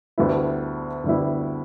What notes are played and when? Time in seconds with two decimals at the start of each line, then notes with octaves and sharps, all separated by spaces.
0.18 D2 D3 G3 B3 E4
1.04 D2 D3 G3 B3 E4